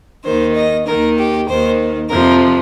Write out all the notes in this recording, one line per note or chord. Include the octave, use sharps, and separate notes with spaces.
D#2 D#3 C5
D#5
D#2 D#3 A#4
G4
D#2 D#3 C5
F2 C3 F3 A#4